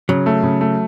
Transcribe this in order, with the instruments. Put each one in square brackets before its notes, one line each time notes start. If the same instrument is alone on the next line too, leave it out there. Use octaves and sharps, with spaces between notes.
[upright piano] C#3 [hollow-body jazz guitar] F#3
[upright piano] A3
C#3
A3